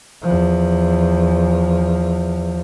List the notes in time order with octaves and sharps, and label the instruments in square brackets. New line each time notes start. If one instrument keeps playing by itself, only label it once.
[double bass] E2 F3